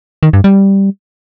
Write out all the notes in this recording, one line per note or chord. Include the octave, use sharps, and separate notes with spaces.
D#3
G2
G3